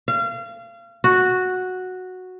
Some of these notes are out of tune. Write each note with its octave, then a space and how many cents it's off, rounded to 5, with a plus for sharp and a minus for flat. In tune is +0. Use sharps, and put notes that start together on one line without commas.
F5 -30
F#4 -5